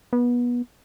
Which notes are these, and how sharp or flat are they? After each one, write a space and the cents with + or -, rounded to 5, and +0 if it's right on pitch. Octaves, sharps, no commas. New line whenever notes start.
B3 -25